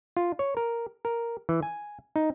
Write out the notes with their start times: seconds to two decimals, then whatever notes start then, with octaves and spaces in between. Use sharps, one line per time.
0.17 F4
0.39 C#5
0.57 A#4
1.05 A#4
1.49 E3
1.63 G#5
2.16 D#4